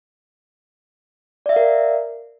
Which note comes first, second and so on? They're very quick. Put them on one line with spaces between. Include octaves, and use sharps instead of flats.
D5 E5 F5 A#4